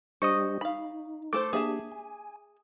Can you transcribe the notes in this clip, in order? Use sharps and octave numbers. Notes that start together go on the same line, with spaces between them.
G3 D4 G4 C5 D#5 C#6 D#6
D#4 F5 B5
A3 A4 C5 D6
A#3 D4 G4 G#4 E5 A5
G#5